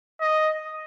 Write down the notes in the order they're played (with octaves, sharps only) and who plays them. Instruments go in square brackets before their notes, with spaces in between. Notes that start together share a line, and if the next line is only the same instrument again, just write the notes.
[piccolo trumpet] D#5